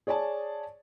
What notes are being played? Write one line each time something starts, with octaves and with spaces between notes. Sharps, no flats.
G#4 C#5 D5 G#5 A5